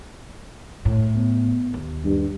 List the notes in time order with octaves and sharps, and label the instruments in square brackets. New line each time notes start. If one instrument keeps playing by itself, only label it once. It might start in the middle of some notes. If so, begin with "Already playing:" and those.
[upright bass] A2
[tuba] B3
[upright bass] D#2
[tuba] G2